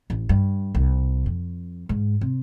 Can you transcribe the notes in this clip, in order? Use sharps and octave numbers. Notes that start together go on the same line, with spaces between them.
A1
G2
C2
F2
G#2
C3